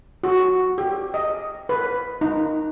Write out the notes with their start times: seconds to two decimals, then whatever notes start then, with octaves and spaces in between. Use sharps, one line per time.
0.24 F#4
0.78 G4
1.14 D#5
1.69 B4
2.21 D#4